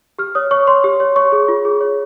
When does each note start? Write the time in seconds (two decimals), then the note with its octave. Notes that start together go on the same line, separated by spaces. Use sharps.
0.19 G4 F6
0.35 C#5 D#6
0.51 C#5 C#6
0.67 C#5 C6
0.84 G4
1.00 C#5
1.16 C#5 C#6
1.32 G#4
1.48 F4
1.65 G#4
1.81 C#5